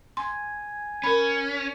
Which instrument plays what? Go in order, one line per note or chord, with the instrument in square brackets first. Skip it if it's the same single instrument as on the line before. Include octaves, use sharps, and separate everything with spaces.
[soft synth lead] G#5 [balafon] C6
[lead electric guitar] C#4 [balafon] A#4 B5